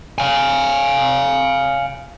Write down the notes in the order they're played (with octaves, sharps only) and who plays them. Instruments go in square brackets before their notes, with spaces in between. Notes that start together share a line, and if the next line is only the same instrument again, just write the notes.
[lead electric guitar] F5 G#5